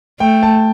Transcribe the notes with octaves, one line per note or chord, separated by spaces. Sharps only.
A3 G5
A5